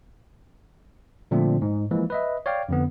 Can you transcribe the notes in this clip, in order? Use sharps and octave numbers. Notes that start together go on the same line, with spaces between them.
A#2 D3 F3 A3 C4 D4
G#2
E3 F3 G#3 A#3
B4 D#5 E5
C#5 D5 F5 G5
F2 D3 B3